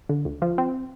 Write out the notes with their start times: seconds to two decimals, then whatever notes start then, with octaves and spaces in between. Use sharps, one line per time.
0.09 D3
0.25 D2
0.42 F3
0.58 C4